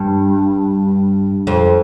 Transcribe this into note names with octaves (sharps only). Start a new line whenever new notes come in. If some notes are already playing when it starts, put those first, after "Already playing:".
Already playing: G2
F2